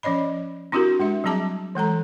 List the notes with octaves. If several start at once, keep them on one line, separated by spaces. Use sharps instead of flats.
F3 C#4 C#5 D#5 B5
C4 D4 E4 F#4 G4 A#4
G#3 D4 E5
F#3 G3 C4 G#4 A5 D6
E3 G#3 A4 A#5